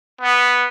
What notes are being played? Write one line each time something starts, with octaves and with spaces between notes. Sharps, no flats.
B3